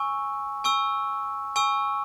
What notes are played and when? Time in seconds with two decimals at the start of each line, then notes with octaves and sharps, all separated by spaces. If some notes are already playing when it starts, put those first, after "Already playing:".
Already playing: G#5 C#6 E6
0.64 G#5 C#6 E6
1.56 G#5 C#6 E6